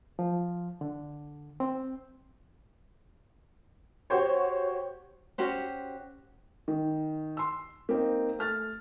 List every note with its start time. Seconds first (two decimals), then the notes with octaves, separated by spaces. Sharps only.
0.19 F3
0.81 D3
1.60 C4
4.10 F#4 G4 C5 C#5
5.38 C#4 F#4 G4 C5
6.68 D#3
7.37 C6 E6
7.89 A#3 C4 D#4
8.39 A3 F6 A6